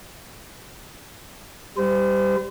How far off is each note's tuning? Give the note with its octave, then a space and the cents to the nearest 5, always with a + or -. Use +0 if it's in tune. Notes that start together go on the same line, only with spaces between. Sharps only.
G3 +0 C5 -35